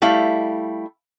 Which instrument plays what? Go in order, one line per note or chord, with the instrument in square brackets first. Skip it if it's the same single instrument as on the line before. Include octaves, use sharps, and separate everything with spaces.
[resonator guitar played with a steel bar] G3 A3 E4 F5